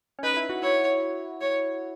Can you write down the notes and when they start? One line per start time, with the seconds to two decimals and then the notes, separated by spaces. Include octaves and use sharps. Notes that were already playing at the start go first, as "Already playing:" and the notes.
0.19 C#4
0.23 D#4 B4
0.37 E4
0.49 F#4
0.63 E4 C#5
1.41 C#5